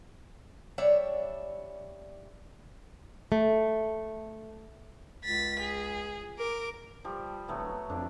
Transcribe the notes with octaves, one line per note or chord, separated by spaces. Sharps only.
G3 D4 C#5 E5
A3
C#2 A6 B6
G#4
A#4 D6
F3 G3
D1 F#3 A3 B3
F2 D4